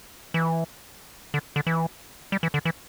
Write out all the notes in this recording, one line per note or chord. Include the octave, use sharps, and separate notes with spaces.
E3
D3
D3
E3
G3
E3
D3
E3